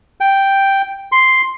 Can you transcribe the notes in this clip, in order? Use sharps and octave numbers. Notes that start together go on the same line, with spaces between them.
G5
C6